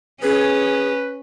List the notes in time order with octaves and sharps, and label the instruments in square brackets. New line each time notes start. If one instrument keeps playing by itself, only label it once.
[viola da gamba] C#4 [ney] G#4 [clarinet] B4